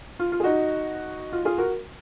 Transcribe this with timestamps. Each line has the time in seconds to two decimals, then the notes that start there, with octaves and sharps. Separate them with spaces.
0.19 F4
0.32 F4
0.40 G#4
0.44 D#4 F#4
1.32 F4
1.45 F4 G#4
1.58 F#4 A#4